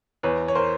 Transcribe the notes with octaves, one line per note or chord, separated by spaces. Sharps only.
E2 B4 C#5
C#5
A#4 C5